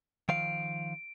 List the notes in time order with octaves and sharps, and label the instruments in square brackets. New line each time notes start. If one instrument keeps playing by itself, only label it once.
[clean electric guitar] D#3 F3 F5 [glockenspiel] D7